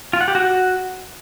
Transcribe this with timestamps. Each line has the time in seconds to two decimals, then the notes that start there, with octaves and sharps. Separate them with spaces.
0.13 F4
0.21 F#5
0.28 G4
0.35 F#4